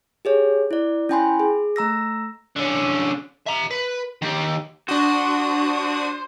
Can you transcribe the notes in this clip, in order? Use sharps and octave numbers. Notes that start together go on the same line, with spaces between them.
G4 G#4 C#5
E4 D5
C#4 E4 G5 G#5 B5 C6
G#4
A3 A#5 E6 A#6
D3 C#4
E5 A#5
B4
D#3 G4
D4 F#4 C5 D#6